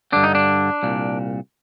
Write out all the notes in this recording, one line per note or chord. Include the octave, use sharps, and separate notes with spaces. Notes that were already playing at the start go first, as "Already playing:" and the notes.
G2 D3 D4
D#4
D4
C2 A#2